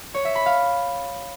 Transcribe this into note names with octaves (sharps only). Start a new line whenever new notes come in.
C#5
E5
B5
F5